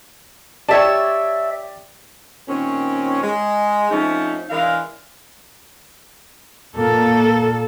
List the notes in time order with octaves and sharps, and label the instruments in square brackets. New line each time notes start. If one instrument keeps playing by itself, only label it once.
[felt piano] G4 D5 [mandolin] C#5 E5 A5
[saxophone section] A#2 D#3 C4 C#4
G#3
F3 A3 C4 C#4 D#4
E3 G#3 D4 A#4 E5 F5
[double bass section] A#2 A#3 [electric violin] A4